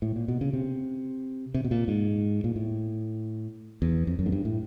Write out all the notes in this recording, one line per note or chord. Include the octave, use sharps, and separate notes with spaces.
A2
A#2
B2
C#3
C3
C3
B2
A#2
G#2
A#2
A2
E2
F2
F#2
G#2
G2
A2